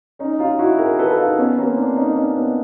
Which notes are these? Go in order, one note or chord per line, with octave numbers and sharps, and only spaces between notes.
C#4 D#4
D#4 F4
E4 F#4
G#4 A#4
A4 B4
D#4 F4
B3 C#4
A#3 C4
C4 D4
C#4 D#4
D4
C#4 D#4
B3 C#4